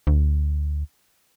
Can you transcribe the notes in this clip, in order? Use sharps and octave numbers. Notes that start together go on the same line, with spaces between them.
D2